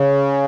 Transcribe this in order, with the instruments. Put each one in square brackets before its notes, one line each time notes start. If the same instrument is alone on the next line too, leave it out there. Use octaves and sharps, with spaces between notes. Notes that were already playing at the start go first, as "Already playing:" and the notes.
Already playing: [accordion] C#3